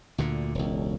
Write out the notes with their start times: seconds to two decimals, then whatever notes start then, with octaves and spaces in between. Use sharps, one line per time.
0.18 D2 A#2 D3
0.55 E1 C#2